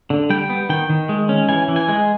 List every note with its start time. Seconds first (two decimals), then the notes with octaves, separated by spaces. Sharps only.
0.10 D3
0.30 G3 G5
0.50 B3
0.69 D#3 G5
0.90 D#3
1.09 G#3
1.29 C#4
1.49 E3 G#5
1.68 E3
1.76 G#5
1.88 G#3